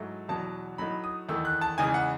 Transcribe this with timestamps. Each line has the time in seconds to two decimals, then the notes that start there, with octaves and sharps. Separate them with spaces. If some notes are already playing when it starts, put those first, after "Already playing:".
Already playing: G#2 F#3 A3 E4
0.28 E2 B2 F#3 A5
0.78 A2 F#3 A3 D#4 B5
1.04 D#6
1.29 E2 D#3 A3 E6
1.45 F#6
1.61 A5
1.78 E2 C#3 E3 G#3 D#4 G#5
1.94 F#5